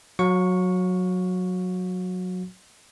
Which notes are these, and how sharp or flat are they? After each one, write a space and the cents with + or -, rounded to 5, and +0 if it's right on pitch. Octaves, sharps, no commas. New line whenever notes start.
F#3 -15 F5 +40 C#6 +0